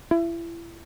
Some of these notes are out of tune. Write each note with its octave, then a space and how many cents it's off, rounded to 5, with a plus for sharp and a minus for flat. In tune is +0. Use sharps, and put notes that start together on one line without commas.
E4 +30